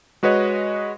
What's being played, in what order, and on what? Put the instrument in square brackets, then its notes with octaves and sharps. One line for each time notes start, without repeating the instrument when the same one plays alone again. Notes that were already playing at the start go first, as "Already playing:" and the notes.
[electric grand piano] G#3 F#4 B4 C#5 D#5